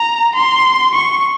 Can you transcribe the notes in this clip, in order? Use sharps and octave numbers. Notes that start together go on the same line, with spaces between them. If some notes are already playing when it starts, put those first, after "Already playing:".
Already playing: A#5
C6
C#6